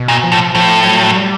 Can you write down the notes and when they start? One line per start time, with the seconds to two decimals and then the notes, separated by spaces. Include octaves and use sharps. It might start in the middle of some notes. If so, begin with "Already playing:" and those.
Already playing: B2
0.08 A#2
0.24 F3
0.32 A2
0.55 A2 F3
0.85 F#3
1.16 G3